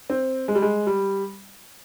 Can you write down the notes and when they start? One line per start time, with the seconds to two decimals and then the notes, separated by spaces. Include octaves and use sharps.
0.10 C4
0.48 G#3
0.55 G3
0.62 G#3
0.87 G3